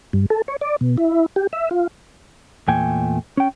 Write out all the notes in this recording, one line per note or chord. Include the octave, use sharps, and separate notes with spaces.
G2
A4
C#5
D5
B2
E4
G4
E5
F4
E2 A#2 A3 G5 G#5
C#4 G5